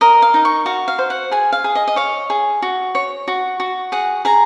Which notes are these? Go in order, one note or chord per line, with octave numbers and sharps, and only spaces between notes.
A#4 D#5
F5
D#4
C#6
F#4 F5
F5
C5
F#5
G#4 G#5
F5
G#4
D#5
D#5
C#5 F5
G#4
F#4
C#5
F#4
F#4
G#4 F#5
G#4 A#5